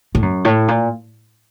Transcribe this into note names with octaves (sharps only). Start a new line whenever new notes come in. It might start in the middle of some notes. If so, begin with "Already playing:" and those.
A2
F#2
A2
A#2